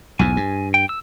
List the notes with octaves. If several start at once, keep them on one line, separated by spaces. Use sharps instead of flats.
B1 E2 G#2 G#5
G2
G5
E6